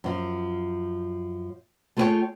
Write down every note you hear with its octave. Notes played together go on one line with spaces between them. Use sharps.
F#2 F3
A3 F4 G#4 A4 C#5 G5